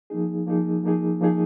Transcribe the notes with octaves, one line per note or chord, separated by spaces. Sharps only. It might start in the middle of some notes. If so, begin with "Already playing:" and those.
F3 A#3 D#4 G#4
F3 A#3 D#4 G#4
F3 A#3 D#4 G#4
F3 A#3 D#4 G#4